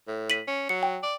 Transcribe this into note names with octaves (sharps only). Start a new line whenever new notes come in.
A2
B6 D#7 F#7
C#4
F#3 C#7
G5
D5